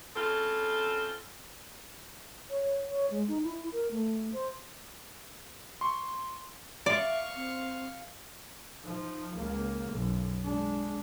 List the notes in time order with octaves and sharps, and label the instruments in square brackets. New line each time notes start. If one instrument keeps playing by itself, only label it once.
[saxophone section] C#3 C4 F4 A4
[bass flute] C#5
C#5
G#3
D#4
E4
A#4
A3
C5
[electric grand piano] C6 C#6
[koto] D5 [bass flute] E5 [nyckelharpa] F5 C#6
[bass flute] C4
[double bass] F3 D#4
C#2 A#3
B1 F#2
G#3 D4